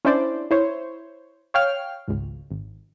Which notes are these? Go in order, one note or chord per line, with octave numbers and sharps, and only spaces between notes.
C#4 D4 E4 C5 D5
E4 C5 C#5
C#5 F5 G5 F6
G#1 C#2
G#1